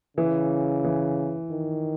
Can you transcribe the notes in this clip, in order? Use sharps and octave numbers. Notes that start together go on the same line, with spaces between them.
C#3 E3
E3
D#3